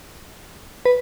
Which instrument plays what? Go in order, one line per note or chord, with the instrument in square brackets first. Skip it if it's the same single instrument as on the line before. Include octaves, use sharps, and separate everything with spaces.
[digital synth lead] B4